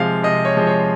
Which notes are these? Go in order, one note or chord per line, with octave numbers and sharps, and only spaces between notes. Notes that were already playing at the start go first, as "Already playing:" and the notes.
Already playing: C3 F3 G#3 F5
C3 D#5
C#5
F3 G#3
C#5